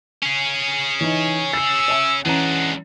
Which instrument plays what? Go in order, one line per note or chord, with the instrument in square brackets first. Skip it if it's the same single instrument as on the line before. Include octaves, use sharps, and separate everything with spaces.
[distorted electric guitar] C#4 G#4
[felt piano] E3 D#4 [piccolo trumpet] C#5
[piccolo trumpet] E6 [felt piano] A6 C7
[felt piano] C#5 E5 G#5
[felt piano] E3 C#4 A#5 [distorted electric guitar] G#3 D4 [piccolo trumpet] F#5